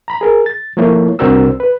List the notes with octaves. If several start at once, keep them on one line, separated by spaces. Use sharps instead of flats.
A#5 B5
G#4 A#4
A6
F3 A3 A#3 E4 C#5
C2 C4 D4 F#4 A#4 E6
B4